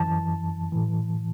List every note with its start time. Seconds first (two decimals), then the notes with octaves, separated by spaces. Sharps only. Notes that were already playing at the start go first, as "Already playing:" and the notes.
Already playing: F#2 E3 A5
0.72 A2 E3